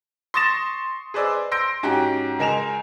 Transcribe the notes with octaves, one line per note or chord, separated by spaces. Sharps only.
C6 C#6 D#6 A6 A#6 E7
G#4 B4 C5 D5 D#5 E6
C6 E6 G6 A#6 D7
G#2 C#4 F#4 G4
C#2 G#3 A#4 G#5 E7 F7